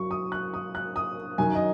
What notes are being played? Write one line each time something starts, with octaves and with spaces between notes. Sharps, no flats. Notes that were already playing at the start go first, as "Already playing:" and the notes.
Already playing: F#2 F#3 C#6
D#6
F#6
D#6
F#6
D#6
F#2 D#3 F#3 G#5
D#5